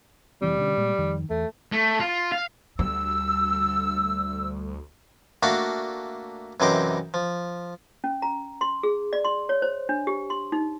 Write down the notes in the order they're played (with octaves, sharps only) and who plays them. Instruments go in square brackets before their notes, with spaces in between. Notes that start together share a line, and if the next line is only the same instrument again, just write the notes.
[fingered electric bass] F1 E3 C4 [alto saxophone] G3
[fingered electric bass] B2 D3 C#4
A#2 G#3
F2 D#3
[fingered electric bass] E2 [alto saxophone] A3
[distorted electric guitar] A3
F4
F5
[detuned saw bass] D2 [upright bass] G3 [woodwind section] E6
[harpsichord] A3 A#3 D4 F#4 E5 F5
F#2 C3 E3 D#4 C5 D6
F3
[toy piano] C#4
A#5
C6
G#4
D5
C6
C#5
C5
D4
G4
C6
D#4